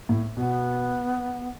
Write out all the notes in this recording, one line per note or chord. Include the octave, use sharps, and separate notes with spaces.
A2
B2 B3